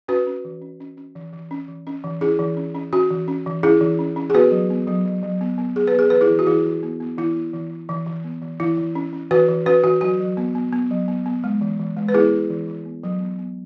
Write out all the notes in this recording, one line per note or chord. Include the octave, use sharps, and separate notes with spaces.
C#4 F#4 B4
C#4
E3
C#4
C#4
C#4
E3
E3
C#4
E3
C#4
E3
C#4 E4 G#4
E3
C#4
C#4
C#4 F#4
E3
C#4
E3
C#4 E4 G#4
E3
C#4
C#4
G#4
B3 F#4 B4
F#3
B3
F#3
F#3
F#3
B3
B3
B3 G#4
B4
B3 G#4
E3 B4
E4 G#4
E3
F#4
E3 E4 G#4
E3
B3
B3
E3 E4
B3
E3
E3
E3
E3
B3
E3
E3 E4
E3
C#4
C#4
E3 F#4 B4
E3
C#4 F#4 B4
E3 F#4
F#3 F#4
F#3
B3
B3
B3
F#3
B3
B3
G#3
E3
E3
G#3
B4
B3 E4 G#4
B3
E3
E3
B3
F#3
B3
B3